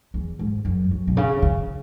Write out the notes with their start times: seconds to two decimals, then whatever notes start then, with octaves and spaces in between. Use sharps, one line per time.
0.14 E2
0.39 G#2
0.65 F#2
0.91 F#2
1.07 B2
1.17 C#3
1.42 C#3